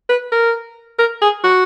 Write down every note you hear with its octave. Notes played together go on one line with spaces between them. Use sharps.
B4
A#4
A#4
G#4
F#4